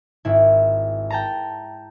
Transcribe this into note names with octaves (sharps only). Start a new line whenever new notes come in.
G#1 E4
G5 A5 A#5